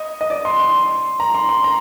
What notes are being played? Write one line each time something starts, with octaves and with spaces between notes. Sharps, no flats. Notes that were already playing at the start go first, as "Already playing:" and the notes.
Already playing: D#5
D#5
D5
C6
C6
A#5
C6
C6
A#5